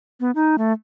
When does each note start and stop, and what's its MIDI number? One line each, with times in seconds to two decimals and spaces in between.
0.20 0.31 59
0.35 0.56 63
0.58 0.73 57